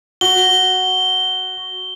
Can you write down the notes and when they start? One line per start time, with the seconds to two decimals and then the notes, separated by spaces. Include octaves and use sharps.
0.21 F#4 G7